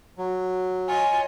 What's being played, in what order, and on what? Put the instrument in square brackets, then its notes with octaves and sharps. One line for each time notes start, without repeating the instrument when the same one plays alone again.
[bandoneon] F#3
[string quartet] F4 C#5 D#5 [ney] G#5